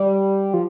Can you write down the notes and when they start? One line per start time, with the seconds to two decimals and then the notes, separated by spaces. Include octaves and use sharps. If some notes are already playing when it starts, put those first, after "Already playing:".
Already playing: G3
0.54 F3